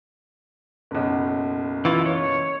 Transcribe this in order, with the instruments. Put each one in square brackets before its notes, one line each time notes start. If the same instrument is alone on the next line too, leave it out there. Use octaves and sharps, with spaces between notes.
[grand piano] F#1 B1
[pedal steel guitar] E3 F4
C#5